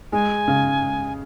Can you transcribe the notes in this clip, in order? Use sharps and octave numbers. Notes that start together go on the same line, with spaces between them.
G#3 G#5
C#3